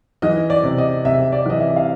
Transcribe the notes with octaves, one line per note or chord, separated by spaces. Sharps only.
E3 D#5
D5
C3
D#5
C3 E5
D5
E3 D#5
E5
F5